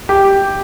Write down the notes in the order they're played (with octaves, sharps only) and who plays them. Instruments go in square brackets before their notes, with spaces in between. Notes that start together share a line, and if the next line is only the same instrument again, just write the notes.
[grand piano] G4